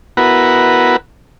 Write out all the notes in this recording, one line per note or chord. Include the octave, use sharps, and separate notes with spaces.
B3 E4 F#4 A#4 B4 F#5